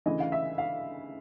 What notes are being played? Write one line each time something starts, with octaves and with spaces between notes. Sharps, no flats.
D2 C#3 E3 D#5
F5
E5
F5